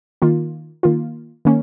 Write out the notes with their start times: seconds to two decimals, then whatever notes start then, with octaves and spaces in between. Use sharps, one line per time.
0.22 D#3 A#3 F4
0.83 D#3 A#3 F4
1.45 D#3 A#3 C#4